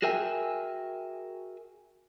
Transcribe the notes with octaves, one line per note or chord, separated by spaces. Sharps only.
F#4 G#4 A#4 E5 G5 G#5